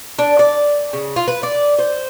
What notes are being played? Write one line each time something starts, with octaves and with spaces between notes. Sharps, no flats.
D4
D5
C#3
F4
B4
D5
C5